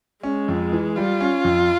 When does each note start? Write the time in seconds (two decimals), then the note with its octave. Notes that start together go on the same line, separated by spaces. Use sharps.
0.23 G#3 C#4
0.48 F2
0.73 E3
0.96 G3 F4
1.21 C#4
1.44 F2